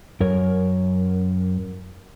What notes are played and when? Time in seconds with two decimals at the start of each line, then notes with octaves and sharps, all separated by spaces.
0.20 F#2 A#4 C#5